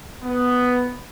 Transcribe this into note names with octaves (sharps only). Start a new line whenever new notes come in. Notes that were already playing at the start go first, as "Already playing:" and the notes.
B3